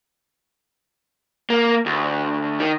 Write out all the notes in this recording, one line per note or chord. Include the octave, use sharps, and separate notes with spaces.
A#3
D2
D#3